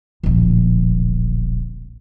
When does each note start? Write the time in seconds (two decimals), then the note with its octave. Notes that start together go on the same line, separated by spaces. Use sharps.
0.23 D1 A#1